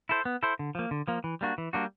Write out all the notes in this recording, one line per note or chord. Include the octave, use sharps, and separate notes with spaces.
E4 A4 C5
B3
E4 A4 C5
D3
F3 A#3
D3
F3 A#3
E3
G3 A#3 D4 F#4
E3
G3 A#3 D4 F#4